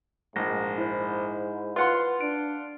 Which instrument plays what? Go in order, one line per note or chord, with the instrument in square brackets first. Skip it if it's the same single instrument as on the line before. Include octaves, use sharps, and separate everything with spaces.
[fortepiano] A#1 [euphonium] G#2 [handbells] A#6
[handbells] E4 C5
[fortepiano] F4 F#5 C6 [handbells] B4
[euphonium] D4 [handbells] D7